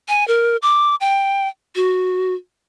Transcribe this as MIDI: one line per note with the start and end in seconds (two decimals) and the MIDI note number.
0.08 0.26 80
0.28 0.57 70
0.62 0.95 86
1.01 1.48 79
1.76 2.34 66